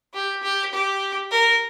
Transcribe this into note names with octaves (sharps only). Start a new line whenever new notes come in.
G4
G4
G4
A#4